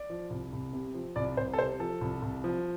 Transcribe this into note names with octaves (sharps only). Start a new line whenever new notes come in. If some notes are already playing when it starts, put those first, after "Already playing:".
Already playing: D5
F3
C2
C2
C3
F3
C2 D5
C2 C5
A4
C3 C5
F3 A4
C2
C2
F3